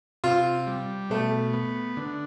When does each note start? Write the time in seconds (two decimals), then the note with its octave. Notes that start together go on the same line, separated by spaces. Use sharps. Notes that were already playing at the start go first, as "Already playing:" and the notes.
0.24 C3 F4
0.67 G3
1.10 B2 A3
1.53 B3
1.97 D3